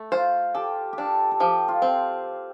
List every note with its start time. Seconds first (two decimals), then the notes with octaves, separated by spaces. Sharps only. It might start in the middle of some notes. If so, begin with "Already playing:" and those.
Already playing: A3
0.12 F4 C5
0.55 G4 A4
0.93 G4
0.98 D4 A4
1.31 A4
1.40 F3 G4
1.68 F4
1.82 C4